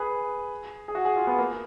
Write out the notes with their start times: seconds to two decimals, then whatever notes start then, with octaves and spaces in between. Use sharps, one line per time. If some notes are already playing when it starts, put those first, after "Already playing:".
Already playing: G#4 B4
0.88 G#4
0.95 F#4
1.05 G#4
1.16 F4
1.27 B3
1.38 A#3